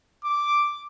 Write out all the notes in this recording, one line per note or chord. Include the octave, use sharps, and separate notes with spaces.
D6